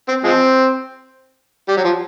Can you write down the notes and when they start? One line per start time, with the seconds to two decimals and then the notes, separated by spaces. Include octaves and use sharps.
0.08 C4
0.24 F3 G#3 C4
1.68 G3
1.77 F#3
1.84 F3